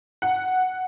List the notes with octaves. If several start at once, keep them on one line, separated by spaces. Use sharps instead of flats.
F#5